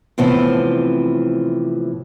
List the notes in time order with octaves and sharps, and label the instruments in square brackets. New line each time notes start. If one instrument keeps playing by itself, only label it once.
[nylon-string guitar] A2 C3 E3 F3 B3 C4